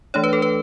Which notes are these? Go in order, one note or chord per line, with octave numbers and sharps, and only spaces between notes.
E3 A3 D4 C#5
B4
A4
B4